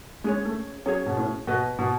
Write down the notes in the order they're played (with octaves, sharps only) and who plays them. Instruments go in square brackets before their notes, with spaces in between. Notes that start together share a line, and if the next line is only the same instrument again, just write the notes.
[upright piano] G#3 [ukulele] C#4 G#4 C#5
[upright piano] A3
[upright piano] F#3 [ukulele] C#4 G#4 C#5
[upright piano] B2
A2
[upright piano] B2 [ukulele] F#4 B4 D#5
[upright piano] B2